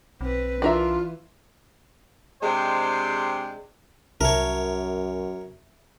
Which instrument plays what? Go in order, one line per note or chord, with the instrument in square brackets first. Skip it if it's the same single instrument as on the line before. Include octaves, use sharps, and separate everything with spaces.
[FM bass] B1 [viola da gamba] C4 B4
[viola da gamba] E3 [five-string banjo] D4 A#4 E5 [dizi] F4
[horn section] C3 G#3 D4 C5 G5
[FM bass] C2 [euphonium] F#2 [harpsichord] A#4 C#5 [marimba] E5 A5